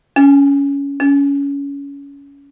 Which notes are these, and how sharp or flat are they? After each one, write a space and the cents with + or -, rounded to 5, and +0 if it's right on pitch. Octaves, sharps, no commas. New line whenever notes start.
C#4 +20
C#4 +25